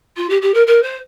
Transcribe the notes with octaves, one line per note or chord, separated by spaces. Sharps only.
F4
G4
G4
A#4
A#4
C5